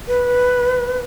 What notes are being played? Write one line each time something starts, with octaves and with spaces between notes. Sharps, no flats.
B4